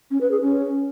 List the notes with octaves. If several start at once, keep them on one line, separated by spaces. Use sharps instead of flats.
C#4
B4
G#4
C#4